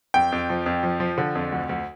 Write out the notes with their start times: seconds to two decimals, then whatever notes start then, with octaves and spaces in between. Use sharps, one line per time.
0.14 F2 G5
0.32 F2
0.50 F3
0.66 F2
0.83 F3
1.00 F3
1.18 D3
1.35 F2
1.52 D2
1.69 D2